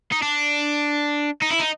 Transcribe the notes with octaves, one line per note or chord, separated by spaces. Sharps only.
D#4
D4
D#4
E4
D#4